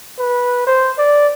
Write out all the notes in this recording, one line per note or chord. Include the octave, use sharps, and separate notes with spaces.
B4
C5
D5